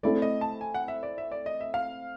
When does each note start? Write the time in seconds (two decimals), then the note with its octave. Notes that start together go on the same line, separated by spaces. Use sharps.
0.03 A3 C4 E4 A4 D5
0.22 D#5
0.41 A5
0.61 G#5
0.74 F#5
0.88 E5
1.03 D5
1.18 E5
1.32 D5
1.46 D#5
1.61 E5
1.74 F5